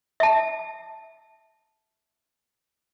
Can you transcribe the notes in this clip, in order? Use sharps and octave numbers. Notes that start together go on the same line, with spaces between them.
E5 A5